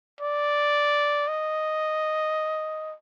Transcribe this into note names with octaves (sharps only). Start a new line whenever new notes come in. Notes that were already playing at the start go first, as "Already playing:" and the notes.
D5
D#5